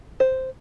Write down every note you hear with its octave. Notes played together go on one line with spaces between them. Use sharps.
C5